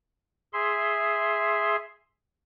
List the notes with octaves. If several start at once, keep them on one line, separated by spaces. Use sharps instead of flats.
G#4 E5 C6